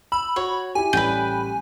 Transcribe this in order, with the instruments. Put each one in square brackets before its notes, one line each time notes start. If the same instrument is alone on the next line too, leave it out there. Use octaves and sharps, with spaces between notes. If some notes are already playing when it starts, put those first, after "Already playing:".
[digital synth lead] B5 [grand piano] E6
[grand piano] F#4 [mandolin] C#5
[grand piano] E4 G4 [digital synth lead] G#5
[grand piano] A1 G3 B5 [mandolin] B4 G5